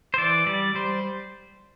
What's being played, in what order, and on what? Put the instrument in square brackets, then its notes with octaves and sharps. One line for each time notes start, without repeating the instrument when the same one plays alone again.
[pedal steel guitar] C5
E3 D5
G3 D5
G3 C5